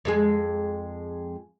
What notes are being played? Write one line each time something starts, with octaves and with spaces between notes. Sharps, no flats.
F2 G#3 G#4